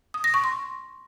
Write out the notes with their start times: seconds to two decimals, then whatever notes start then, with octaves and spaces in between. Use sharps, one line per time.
0.14 D#6
0.24 A#6
0.34 C#6
0.44 C6